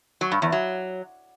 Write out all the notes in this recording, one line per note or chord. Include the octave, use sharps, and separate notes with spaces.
F#3
G2
E2
F#3